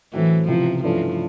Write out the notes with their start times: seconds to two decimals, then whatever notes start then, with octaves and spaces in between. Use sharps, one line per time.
0.13 A2 E3 F#3 A3 C4
0.48 C#2 C3 E3 F3
0.83 G2 E3 F3 A3 C#4